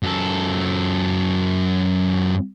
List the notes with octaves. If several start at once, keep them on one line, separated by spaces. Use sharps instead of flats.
F#2 A4